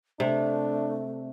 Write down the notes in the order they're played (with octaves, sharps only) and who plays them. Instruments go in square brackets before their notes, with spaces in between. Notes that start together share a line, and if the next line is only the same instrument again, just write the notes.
[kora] C3 [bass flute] A3 [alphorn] D4